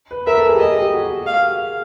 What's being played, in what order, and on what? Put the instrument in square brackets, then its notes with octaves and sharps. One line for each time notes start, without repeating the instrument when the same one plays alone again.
[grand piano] B4
[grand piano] A#4 [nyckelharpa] E5
[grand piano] A4
G#4
G4
[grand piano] G#4 [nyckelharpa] D#5
[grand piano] G4
G4
F#4
G4
[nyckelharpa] F5